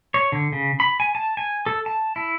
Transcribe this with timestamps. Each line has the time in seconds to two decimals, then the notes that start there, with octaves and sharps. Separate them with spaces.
0.14 C#5
0.32 D3
0.52 C#3
0.80 B5
1.00 G#5
1.15 A5
1.37 G#5
1.66 A4
1.86 A5
2.16 E4